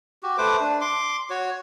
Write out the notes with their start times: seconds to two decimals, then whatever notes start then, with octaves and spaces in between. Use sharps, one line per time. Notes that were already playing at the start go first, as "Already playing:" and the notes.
0.23 F#4 G4
0.38 A3 B4 C5 D6
0.60 D4
0.81 C6 D6
1.30 F#4 C#5